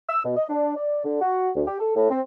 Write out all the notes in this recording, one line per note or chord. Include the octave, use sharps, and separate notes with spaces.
E6
B2
D#5
D4
D5
D3
F#4
D2
G4
A4
A2
C4